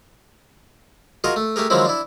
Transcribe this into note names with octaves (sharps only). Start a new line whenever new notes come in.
F4 F#4 G#4 A#4 D#5
A3
A3 G4 G#4 A#4
D#3 F3 F#3 G#3 C4 E4
D4 E4